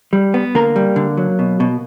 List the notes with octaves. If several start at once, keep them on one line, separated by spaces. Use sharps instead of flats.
G3
B3
D3 A#3 A#4
G3
D3
F#3
B2
B2